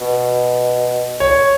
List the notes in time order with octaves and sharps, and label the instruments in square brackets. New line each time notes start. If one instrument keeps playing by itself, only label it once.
[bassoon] B2
[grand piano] C#5